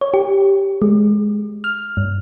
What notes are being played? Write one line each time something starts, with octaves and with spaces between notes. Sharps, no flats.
C#5
G4
G#3
F6
G2